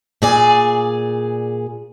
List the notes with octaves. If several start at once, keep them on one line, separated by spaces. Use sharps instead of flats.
A#2 G#4 D5